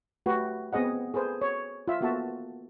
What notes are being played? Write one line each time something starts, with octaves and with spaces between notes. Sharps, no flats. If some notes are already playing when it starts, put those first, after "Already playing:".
A3 F#4 G4 B4
B3 C4 G#4 D#5 F#5
G#4 A4 B4 C5
C#5
F4 E5
A#3 B3 F#4 A4 E5 A5